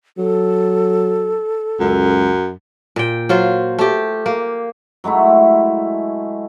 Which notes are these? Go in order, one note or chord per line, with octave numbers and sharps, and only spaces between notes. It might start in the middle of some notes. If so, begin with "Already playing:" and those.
F#3 A4
C#2 F#2
A#2 G5
F#3 F4 C5
A3 G4
A#3
F#3 G#3 A3 E4